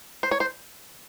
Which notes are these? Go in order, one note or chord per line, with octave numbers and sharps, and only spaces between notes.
C5
C#5
C5